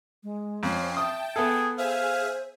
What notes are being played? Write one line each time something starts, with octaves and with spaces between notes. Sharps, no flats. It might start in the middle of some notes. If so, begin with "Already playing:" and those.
G#3
F2 C4 C#4 C7
E5 G5 A5 D#6
B3 G#4 A4
G#4 C5 E5 F5 G#5